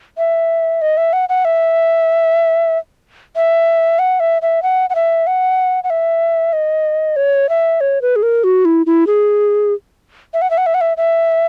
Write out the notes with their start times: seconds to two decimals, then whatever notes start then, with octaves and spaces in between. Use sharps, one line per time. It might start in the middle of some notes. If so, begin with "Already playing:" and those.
0.18 E5
0.82 D#5
0.97 E5
1.13 F#5
1.29 F#5
1.45 E5
3.36 E5
3.99 F#5
4.20 E5
4.42 E5
4.63 F#5
4.90 F#5
4.95 E5
5.27 F#5
5.84 F#5
5.90 E5
6.53 D#5
7.16 C#5
7.49 E5
7.81 C#5
8.02 B4
8.16 G#4
8.23 A#4
8.44 F#4
8.65 E4
8.86 E4
9.07 G#4
10.34 E5
10.42 F#5
10.51 E5
10.58 F#5
10.66 E5
10.74 F#5
10.81 E5
10.97 E5